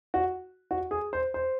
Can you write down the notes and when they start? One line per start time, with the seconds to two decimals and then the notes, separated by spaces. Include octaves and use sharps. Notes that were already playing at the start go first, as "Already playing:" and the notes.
0.14 F#4
0.71 F#4
0.91 G#4
1.13 C5
1.34 C5